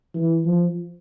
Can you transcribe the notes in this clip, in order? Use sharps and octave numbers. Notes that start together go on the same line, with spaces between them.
E3
F3